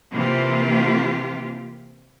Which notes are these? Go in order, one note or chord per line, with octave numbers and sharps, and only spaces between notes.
C3 E3 A#3 F4 G4